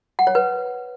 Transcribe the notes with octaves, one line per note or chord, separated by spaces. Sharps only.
F#5
C#5
B4